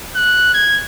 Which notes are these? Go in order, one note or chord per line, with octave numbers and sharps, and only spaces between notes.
F#6
G#6